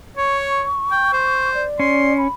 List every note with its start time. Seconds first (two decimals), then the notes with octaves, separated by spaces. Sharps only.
0.17 C#5 C#6
0.91 G5
1.13 C5
1.54 D5
1.80 C#4 C6
2.18 B5